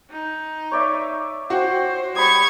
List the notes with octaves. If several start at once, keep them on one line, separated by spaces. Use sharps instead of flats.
D#4
C#5 D5 E5
F#4 C5 F#5 G5
G3 B5 C#6 D#6 G#6